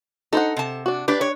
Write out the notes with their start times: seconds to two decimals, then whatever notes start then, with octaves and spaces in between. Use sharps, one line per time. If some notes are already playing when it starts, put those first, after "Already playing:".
0.33 D#4 A4 C5 F#5
0.57 C3 A5
0.86 D4 F#4
1.08 D4 G4 B4 D5
1.21 C#5